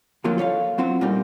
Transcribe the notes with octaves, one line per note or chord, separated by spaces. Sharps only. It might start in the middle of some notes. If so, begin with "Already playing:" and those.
D2 F3 F#3 A#3 F4
A4 C#5 E5 F5
F#3 C4 F4 F#4
A#2 G3 A#3 D#4